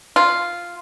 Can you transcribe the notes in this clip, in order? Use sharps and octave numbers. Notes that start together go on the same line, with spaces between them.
F4